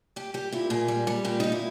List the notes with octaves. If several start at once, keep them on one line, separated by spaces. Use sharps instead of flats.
G3 G4
G3 G4
A#2 E4
A#2 G#4
G3
G3
A#2 G4
A#2 D#4
E4